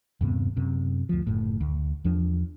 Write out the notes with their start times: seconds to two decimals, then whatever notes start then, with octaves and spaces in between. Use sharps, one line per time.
0.21 D#1 G2 C3 B3
0.57 F#2 C3
1.09 D2 F3
1.27 F#1 A2
1.61 D2
2.05 E2 F3 D4